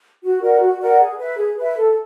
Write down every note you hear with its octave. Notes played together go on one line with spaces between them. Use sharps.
F#4
A#4 D5 F#5
F#4
A#4 D5 F#5
G#4
B4 E5
G#4
B4 E5
A4